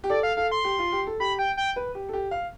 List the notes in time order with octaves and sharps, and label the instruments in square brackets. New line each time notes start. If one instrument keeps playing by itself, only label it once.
[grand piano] G4
[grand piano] A4 [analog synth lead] D5
[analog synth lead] F5
[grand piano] A4 [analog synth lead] F5
[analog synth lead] C6
[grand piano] G4
F4
G4
A4
[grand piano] G4 [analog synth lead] B5
[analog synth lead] G5
G5
[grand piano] B4
G4
A4
G4
F5